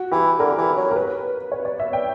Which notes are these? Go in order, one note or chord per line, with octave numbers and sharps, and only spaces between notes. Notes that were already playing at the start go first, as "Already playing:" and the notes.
Already playing: F#4
E3 G4
D3 A#4
E3
F#3
A#4
B4
C#5
D5
E5
G5